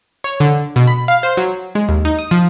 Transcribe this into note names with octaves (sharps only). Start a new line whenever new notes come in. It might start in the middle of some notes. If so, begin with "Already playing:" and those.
C#5
D3
B2
B5
F5
C5
F#3
G#3
D#2
D#4
D#6
F3